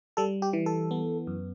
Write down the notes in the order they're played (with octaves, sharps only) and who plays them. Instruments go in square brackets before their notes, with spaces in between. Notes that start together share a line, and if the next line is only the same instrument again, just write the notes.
[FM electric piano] G3 A4
G4
E3
A4
B3
F#2